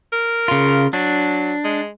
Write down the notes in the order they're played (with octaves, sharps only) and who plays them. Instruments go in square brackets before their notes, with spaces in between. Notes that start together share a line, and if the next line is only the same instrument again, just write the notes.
[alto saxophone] A#4
[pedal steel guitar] C#3 F4
[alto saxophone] F#3 [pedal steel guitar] D4
[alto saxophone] G#3